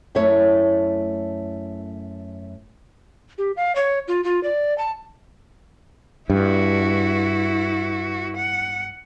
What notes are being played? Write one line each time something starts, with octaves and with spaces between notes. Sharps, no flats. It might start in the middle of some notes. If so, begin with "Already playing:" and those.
F#2 A3 E4 C#5
G4
F5
C#5
F4
F4
D5
A5
G2 E4 F#4
F#5